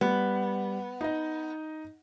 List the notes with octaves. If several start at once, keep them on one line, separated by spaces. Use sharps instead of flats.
G3 B3
D#4 D#5